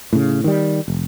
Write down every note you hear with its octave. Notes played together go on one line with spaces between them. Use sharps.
A2 C#3
D#3 G3
F1